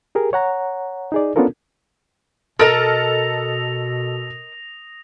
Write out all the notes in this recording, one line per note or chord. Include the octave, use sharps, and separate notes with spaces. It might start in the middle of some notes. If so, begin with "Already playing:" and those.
G4 G#4 A#4
C#5 F#5 A#5
D#4 G#4 D5
B3 C#4 D4 F4 A4 A#4
B2 A4 A#4 D#5 D#6 F6 A#6 F7